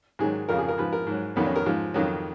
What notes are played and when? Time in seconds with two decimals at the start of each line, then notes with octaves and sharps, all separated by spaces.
0.19 G#2 D#3 F#3 G#4
0.49 F2 C#3 F3 A#4
0.58 G#4
0.68 A#4
0.78 G#2 F3 B4
0.93 A#4
1.07 G#2 F#3
1.36 F2 D#3 F#3 B3
1.46 C#4
1.56 A#4
1.66 G#2 F3
1.94 F2 D#3 F#3